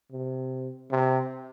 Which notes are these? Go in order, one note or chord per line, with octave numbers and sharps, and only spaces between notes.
C3
C3